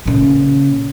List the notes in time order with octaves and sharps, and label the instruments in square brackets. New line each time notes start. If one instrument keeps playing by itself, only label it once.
[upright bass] A#2 C#3